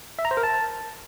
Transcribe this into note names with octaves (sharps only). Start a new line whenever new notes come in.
E5
A#5
C5
A#4
A5